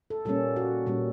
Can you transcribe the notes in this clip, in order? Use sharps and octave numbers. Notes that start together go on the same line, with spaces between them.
A4
A#2 G3 A#3 C#4 A4
F#4
A#2 G3 A#3 C#4